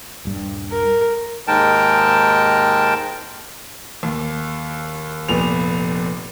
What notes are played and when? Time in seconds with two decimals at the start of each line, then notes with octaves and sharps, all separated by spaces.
0.25 D#1 G2
0.70 A#4
1.47 D#2 G#2 G#3 A#4 G5 A5
4.03 D#2
5.28 F1 A#2 B3 F7